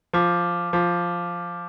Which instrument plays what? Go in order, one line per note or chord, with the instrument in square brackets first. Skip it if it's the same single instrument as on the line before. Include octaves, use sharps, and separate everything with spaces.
[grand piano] F3 [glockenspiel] D6 F6 B6
[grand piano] F3 [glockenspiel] D6 F6 B6